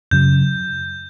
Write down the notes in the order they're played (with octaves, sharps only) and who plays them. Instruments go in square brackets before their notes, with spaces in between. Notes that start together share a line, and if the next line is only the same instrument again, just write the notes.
[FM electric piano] F#2 C#3 F#3 [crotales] G6